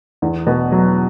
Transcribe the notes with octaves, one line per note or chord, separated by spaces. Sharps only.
E2
B2
F#3